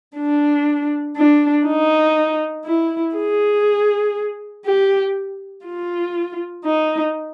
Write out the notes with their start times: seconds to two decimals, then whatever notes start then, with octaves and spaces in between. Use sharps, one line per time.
0.17 D4
1.17 D4
1.67 D#4
2.66 E4
3.16 G#4
4.65 G4
5.66 F4
6.65 D#4